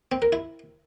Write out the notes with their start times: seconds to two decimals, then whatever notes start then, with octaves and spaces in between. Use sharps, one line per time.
0.12 C4
0.22 A#4
0.32 E4